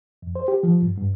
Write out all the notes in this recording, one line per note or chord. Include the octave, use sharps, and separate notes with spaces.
F2
C5
G4
F3
G2
G2